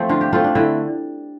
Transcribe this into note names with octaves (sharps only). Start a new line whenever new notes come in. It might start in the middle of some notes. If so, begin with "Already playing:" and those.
Already playing: F3 A3 C4
D3 F4
G4
A3 C4 F4
D4
D3 E4